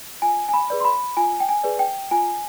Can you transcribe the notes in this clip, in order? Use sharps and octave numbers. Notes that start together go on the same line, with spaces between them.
F4 G#5
G#5
B5
G#4 B4 D5
C6
B5
F4 G#5
G5
G#5
G#4 B4 D5
G5
F4 G#5